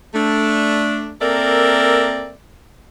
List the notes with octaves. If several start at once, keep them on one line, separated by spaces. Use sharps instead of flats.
A3 D4
A#3 C4 A4 A#4 D5 E5